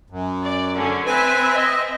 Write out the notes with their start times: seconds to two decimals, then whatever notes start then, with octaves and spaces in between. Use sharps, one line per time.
0.10 F#2
0.45 D5
0.76 D3 C#4
1.06 C4 B4 E5 G#5
1.56 D#5